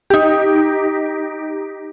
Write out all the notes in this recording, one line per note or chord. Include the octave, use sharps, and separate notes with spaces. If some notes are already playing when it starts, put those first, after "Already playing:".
D#4 G4